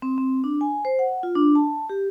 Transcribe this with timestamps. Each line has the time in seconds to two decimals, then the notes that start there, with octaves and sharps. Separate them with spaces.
0.02 C4
0.18 C4
0.44 D4
0.61 G#5
0.85 C5
0.99 F#5
1.23 F4
1.35 D4
1.55 A5
1.90 G4